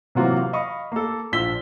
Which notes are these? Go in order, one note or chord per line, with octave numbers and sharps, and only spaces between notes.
C3 E3 F#3 A#3 F4 F#4
F5
D#5 F5 B5 C#6 D#6
A#3 A4
A#1 D4 F4 E6 B6 G7